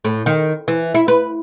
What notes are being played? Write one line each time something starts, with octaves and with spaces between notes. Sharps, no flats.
A2
D#3
E3
E4
B4